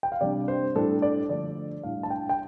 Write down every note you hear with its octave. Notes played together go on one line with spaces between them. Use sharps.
G5
F5
C3 G3 D4 D5
C5
A2 G3 D4 A4
D5
D3 F3 A3 D5
A2 G3 D4 F5
A5
G5
G5